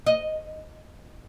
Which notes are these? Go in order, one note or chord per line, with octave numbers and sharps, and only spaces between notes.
D#5